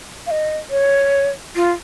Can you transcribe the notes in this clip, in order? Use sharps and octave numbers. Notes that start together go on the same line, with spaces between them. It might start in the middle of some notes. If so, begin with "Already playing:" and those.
F5
D#5
C#5
F4